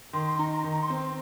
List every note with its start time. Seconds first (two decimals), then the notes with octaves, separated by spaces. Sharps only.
0.13 D#3 C6
0.26 C6
0.39 D#4 A#5
0.51 A#5
0.64 D#3
0.73 A#5
0.81 C6
0.90 C4